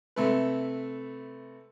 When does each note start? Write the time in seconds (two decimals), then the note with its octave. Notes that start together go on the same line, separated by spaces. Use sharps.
0.16 C3 A3 B4